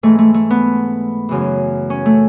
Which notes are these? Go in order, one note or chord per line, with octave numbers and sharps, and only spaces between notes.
G#2 E3 A3
A3
A3
B3
F#2 C#3 E3
C#4
A3